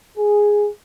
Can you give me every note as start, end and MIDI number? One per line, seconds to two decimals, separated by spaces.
0.18 0.67 68